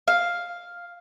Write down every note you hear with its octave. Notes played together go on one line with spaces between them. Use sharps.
F5